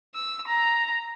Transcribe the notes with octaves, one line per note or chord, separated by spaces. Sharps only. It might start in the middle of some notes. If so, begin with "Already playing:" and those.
E6
A#5